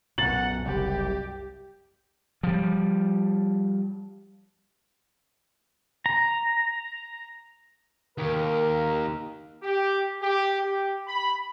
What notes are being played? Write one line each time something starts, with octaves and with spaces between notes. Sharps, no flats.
B1 F#2 A#2 F#5 A6 F#7
F#1 C2 G4
F3 G3
A#5
D#2 A#4
G4
G4
G4
B5